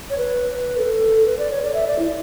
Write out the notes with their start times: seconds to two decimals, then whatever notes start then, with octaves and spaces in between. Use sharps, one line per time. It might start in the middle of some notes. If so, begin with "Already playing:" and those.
0.10 C#5
0.18 B4
0.78 A4
1.27 B4
1.38 D5
1.51 C#5
1.62 D5
1.74 E5
1.87 D5
1.99 E4